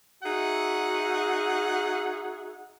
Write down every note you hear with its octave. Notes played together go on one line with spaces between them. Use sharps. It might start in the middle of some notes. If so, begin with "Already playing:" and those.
D#4 F#4 G#4 E5 F#5